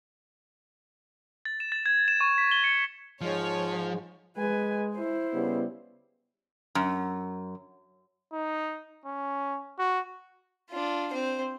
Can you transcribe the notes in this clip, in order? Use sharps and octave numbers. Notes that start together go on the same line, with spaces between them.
A6
E7
A6
G#6
E7
C#6
B6
G7
C#7
G#2 F3 G#3 C#5
G#3 B4 G#5
E4 C5
C#3 G3 B3
F#2
D#4
C#4
F#4
D4 F4
C4 C5